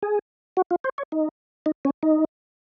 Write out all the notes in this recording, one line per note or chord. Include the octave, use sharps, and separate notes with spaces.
G#4
F#4
F4
C5
C#5
D#4
D#4
C#4
D#4